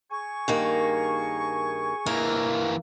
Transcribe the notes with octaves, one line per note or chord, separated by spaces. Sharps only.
G#4 G#5 C#6
G2 D#3 A#3
E3 A#3 A#4